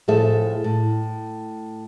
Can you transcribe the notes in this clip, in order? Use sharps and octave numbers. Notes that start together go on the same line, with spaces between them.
A2 F3 G#4 A4 E5
A2